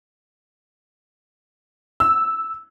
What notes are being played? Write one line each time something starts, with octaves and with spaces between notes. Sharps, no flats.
E6